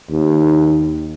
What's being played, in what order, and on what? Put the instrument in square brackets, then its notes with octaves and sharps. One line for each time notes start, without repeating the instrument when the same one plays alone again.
[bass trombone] D#2